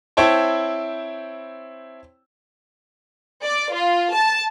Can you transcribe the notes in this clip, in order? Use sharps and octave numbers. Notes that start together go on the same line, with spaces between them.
C4 E4 C#5 G5 A5
D5
F4
A5